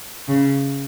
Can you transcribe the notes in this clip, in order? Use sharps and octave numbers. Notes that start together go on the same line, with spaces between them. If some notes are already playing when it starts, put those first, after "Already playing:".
C#3